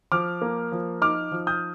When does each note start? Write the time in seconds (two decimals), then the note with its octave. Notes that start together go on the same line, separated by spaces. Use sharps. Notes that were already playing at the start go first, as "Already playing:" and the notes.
0.12 F3 D6 F6
0.42 A#3
0.72 F3
1.01 D#4 D6 F6
1.32 F3
1.47 D#6 G6